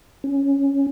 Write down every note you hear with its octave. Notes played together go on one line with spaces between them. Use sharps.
C#4